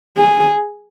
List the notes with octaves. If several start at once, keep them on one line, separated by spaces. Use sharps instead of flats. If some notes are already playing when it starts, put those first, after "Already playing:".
G#4